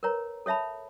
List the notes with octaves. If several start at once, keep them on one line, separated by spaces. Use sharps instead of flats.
A#4 B4 C#5 A#5
A4 C#5 E5 A5 B5